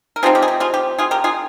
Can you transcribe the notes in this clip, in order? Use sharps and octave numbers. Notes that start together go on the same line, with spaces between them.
A#4
C3 F3 C4 D#4 F4 G#4
G4
G#4
G4
F4 G#4
G4
F4 G#4
G4 A#4
F4 G#4